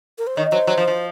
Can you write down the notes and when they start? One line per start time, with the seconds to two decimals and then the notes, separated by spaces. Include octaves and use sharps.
0.18 A#4
0.27 C5
0.36 D#3 C#5
0.52 F#3 C5
0.67 F#3
0.78 F3
0.88 F3